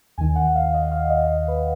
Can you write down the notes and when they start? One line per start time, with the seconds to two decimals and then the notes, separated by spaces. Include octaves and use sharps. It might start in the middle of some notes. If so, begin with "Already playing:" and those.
0.18 D#2 D#3 G#5
0.36 F#5
0.55 F5
0.74 D#5
0.91 F5
1.10 D#5
1.48 B4